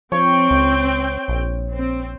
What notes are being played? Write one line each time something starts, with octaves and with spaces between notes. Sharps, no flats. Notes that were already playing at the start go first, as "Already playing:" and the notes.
F3 C4 C#5 G5
C#2
A#1
C4